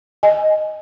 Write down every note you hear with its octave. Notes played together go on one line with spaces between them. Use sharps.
D#5 G#5